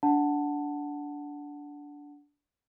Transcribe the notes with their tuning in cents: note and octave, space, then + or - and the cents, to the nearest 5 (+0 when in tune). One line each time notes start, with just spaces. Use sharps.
D4 -15 F#5 +0 A5 +5